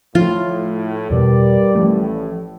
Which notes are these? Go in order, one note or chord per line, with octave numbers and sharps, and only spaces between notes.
A2 F3 F4
E2 B2 G3 A#4 B4 D5
A1 A2 F3 A3